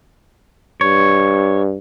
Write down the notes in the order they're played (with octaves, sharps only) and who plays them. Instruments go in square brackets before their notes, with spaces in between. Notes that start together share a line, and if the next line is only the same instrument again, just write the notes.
[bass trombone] G2 [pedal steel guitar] C#5